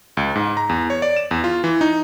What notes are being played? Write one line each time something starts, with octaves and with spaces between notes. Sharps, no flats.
C#2
G#2
A#5
E2
C#5
D5
E7
E2
F4
E3
D#4